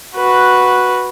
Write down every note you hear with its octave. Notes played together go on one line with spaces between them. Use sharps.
F#4 B4